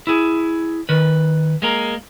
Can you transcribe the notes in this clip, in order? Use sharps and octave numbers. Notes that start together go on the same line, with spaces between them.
E4 G#4
D#3 B4
G#3 A#3 A#5